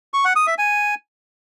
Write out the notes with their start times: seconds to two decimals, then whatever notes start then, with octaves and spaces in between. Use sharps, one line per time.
0.14 C#6
0.25 F#5
0.36 D#6
0.47 E5
0.58 G#5